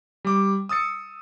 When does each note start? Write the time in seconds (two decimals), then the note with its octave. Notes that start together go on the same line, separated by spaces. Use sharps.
0.25 G3 D6
0.69 D#6 E6 A6 C#7